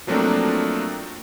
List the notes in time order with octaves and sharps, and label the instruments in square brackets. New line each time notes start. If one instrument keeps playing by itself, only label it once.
[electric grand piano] F3 F#3 A3 A#3 C4 D4